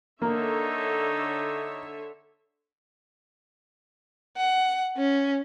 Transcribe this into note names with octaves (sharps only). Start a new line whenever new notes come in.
D3 A#3 D#4 C#5 E5
F#5
C#4